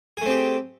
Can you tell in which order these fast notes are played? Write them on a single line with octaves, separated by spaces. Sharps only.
G#4 A3 C4 G4